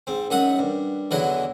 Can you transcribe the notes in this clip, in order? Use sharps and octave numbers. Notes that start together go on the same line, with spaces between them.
G#2 C4
F#2 D#4 E5 F#5 D#6
G2
E2 D3 E3 F#3 E4 D#5